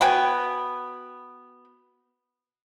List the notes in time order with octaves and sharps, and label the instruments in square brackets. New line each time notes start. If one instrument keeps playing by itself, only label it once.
[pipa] B3 F#4 G5 G#5